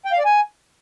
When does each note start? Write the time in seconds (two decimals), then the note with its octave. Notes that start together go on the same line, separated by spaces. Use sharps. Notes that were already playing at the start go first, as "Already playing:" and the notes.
0.05 G5
0.12 F5
0.19 D5
0.25 G#5